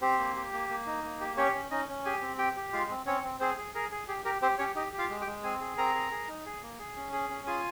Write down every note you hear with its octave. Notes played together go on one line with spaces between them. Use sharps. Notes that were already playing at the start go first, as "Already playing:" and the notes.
C4 G4 C5
A#3
G4
A#3
A#3
D#4
A#3
G4
C#4 G4 C#5
C#4
C#4 D#4 D#5
C#4
G4 G#4 G#5
C4
G4 G5
G4
G#3 F4 F5
C4
C4 C#4 C#5
C4
C4 G#4 C5
G#4
G#4 A#4
G#4
G4 G#4
G4 A#4
C4 G4 C5
C#4 G4 C#5
D#4 G4 D#5
G4
F4 F5
G#3
G4 G5
G#3
C4 G#4 G#5
G#4
C4 A#4 A#5
G#4
G#4
D#4
G#4
A#3
G#4
C#4
G#4
C#4
F4 G#4 G#5